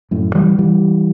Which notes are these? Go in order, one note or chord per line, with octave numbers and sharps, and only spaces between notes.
F#2 A2
E3 G3
E3 G3